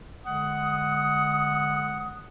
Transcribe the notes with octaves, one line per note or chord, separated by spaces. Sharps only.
D3 G#3 F#5 D#6